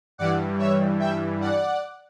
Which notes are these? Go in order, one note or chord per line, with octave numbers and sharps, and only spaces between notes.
G2 E3 G3 D5 F#5
C#5 E5
E5 G5
D5 F#5